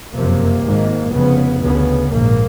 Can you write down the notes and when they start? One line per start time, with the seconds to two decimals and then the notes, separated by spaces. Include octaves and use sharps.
0.14 F#1 F2 C3 A#3
0.64 G#1 G#2
1.13 F1 F2 C#3 B3
1.61 D2 C#3 B3
2.11 A#1 G#2 A#3